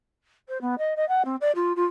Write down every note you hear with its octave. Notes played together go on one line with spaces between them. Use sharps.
C5
B3
D#5
D#5
F#5
C4
D5
F4
F4